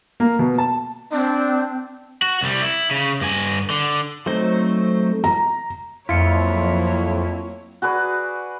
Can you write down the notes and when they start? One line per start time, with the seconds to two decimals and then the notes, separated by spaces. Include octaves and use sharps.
0.20 A#3
0.39 B2
0.58 A5
1.13 C4 D4
2.22 F#4
2.42 C2 G3
2.62 E4
2.91 C#3
3.21 G2 G#5
3.70 D3
4.26 F#3 A3 C4 D#4 C5
5.24 A#5
6.09 F2 F#3 A#3 E4 F4 C#5 C#7
7.82 F#4 G#4 B4 D5